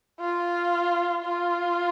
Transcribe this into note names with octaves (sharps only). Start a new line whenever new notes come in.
F4
F4